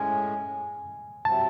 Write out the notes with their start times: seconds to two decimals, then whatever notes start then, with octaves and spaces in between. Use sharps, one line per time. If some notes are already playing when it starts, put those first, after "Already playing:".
Already playing: A2 G#3 C#4 G#5
1.25 C3 F#3 C4 E4 A5